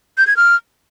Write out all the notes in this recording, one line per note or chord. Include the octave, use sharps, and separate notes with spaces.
G6
G#6
F6